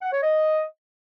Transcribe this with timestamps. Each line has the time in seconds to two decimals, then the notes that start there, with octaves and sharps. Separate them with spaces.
0.01 F#5
0.12 C#5
0.22 D#5